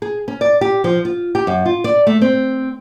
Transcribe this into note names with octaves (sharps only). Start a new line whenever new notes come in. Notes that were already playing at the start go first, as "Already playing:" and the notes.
G#4
C#4
D5
G4
F3
F4
G4
F#2
F4
D5
A3
C4